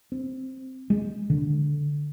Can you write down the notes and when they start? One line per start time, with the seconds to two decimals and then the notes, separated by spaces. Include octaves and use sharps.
0.12 C4
0.90 G#3
1.30 D3